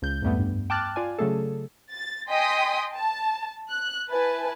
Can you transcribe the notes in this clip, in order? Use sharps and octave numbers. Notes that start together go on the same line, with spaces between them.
C#2 G6
F2 G#2 G3 A3 B3
G2
G5 A5 D6 F6 F#6 A6
F4 D5 G#5
C#3 F#3 A3 G#4 A4
A6
D#5 G5 G#5 C6 D#6 B6
A5
F#6
E4 B4 G#5 A5